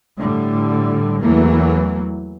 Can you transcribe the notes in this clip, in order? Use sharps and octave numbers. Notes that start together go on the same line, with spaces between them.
A2 D3 G3
E2 E3 F#3 A3 A#3